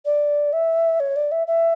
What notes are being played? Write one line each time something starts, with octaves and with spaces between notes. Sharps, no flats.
D5
E5
C#5
D5
E5
E5